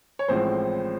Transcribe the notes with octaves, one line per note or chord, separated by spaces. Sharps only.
C#5
A1 A2 F3 G#3 C4 C5